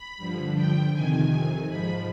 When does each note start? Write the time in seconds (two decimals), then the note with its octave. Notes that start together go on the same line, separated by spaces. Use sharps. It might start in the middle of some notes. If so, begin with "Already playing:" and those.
Already playing: B5
0.17 G2 D3 F3
0.54 G5
0.92 F2 C3 D#3 G#5
1.68 G#2 F3 B5